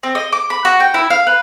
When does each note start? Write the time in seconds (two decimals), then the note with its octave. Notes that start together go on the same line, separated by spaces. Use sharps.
0.03 C4
0.15 D#5
0.33 D6
0.50 B5
0.65 F#4
0.80 G5
0.94 E4
1.10 F5
1.27 B4